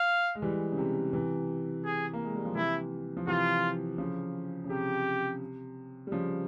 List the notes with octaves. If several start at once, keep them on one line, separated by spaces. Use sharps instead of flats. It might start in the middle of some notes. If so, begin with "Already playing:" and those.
Already playing: F5
G#3
E3 G3
C#3
C3
C3 E3
G#4
A#3
G#3
G3
F3
C3 E3 E4
F3
C3 E3 F4
C#3 F3
C#3
C3 G4
G3
C#3 F3